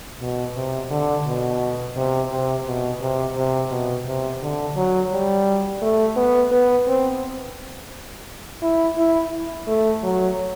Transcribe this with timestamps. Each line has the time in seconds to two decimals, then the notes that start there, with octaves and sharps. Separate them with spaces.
0.20 B2
0.56 C3
0.90 D3
1.26 B2
1.97 C3
2.31 C3
2.66 B2
3.01 C3
3.36 C3
3.71 B2
4.07 C3
4.42 D3
4.77 F#3
5.12 G3
5.82 A3
6.17 B3
6.52 B3
6.87 C4
8.63 E4
8.98 E4
9.68 A3
10.03 F#3